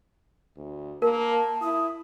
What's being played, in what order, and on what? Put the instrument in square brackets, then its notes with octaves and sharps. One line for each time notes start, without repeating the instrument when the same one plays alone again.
[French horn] D2
[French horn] A#3 [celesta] A#4 [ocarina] A5
[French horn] E4 [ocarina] D#6